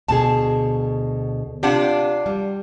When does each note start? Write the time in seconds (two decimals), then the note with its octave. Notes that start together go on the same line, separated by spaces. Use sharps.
0.08 D2 B2 G#4 A5
1.63 C3 D4 F4 G4 F#5
2.26 G3